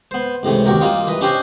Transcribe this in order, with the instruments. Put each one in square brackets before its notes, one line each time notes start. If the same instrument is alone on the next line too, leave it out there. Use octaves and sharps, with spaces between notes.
[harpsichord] B3 C5
C#2 A2 C3 E3
D#2 F#4 G4 A#4
G3 A#3 D#4 F4
E3 B4 D#5
C#4 D4 G4 C5 D#5 G#5